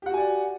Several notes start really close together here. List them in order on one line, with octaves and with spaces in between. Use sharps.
G4 F#5 F#4 G#5 D5